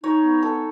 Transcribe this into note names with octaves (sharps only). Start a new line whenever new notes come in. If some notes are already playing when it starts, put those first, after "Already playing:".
D#4 C#5
B3
D#4 A4